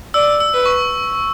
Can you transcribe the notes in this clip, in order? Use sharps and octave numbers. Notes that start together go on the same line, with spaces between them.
D5 E6
E6
B4
C#6